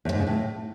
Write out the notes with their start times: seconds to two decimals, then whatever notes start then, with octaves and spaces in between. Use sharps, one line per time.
0.05 E2
0.12 G#2
0.19 C#3
0.27 A2